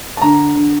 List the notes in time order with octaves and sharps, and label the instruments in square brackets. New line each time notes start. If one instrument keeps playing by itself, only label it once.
[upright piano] A5
D3 A#5
D3